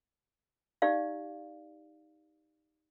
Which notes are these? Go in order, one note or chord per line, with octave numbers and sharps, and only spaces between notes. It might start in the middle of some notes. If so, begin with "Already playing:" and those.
D#4 G4 D5 F5